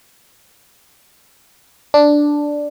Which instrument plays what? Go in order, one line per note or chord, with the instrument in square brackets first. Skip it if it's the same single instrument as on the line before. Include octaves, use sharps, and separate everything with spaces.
[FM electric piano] D4